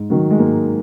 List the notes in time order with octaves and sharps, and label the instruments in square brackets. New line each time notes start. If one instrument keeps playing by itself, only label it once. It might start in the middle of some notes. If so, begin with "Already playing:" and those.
Already playing: [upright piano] G#2
D#3 F#3
G#3
G#2 A#3